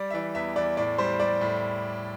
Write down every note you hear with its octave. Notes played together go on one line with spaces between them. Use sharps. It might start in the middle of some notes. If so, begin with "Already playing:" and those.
Already playing: G3 D5
E5
E3 D5
E2 E5
E2 D5
A2 D5
G3 C5
G3 D5
A2